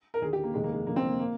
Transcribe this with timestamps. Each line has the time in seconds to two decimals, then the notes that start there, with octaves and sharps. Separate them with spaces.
0.14 A#4
0.21 D#2 D3 G#4
0.33 G4
0.43 A#3
0.54 F1 D#2 D#3 G#3
0.64 A#3
0.72 G#3
0.87 F1 F2 D3 A#3
0.96 C4
1.07 A#3
1.19 A#3